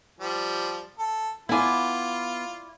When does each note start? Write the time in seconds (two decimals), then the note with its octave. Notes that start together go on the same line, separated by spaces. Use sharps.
0.20 F3 G3
0.99 A4
1.49 B3 E4 F4 D5 G#5